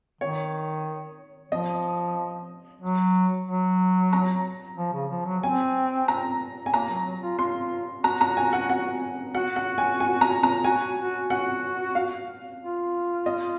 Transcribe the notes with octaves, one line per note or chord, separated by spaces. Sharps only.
D#3 C#5
F3 D#5
F#3
F#3
A#5
F3
C#3
F3
F#3
C4 G#5
A#5
G#5
A#3 A#5
F#3
F#3
F4
F4 C6
F#4 A#5
A#5
G#5
F#5
F#5
F#4 F#5
F#5
G#5
G#5
A#5
A#5
F#4 G#5
F#4
F#4 F#5
F5
F4
D#5